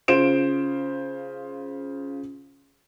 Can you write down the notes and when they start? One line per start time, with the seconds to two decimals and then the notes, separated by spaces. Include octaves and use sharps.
0.08 C#3 F4 C5 D7 E7